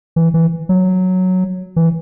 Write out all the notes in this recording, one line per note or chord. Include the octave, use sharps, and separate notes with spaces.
E3
E3
F#3
E3